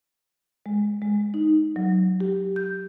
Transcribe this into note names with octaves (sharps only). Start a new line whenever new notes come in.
G#3
G#3
D#4
F#3
G4
G6